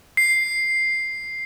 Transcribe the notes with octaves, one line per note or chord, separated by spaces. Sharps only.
C7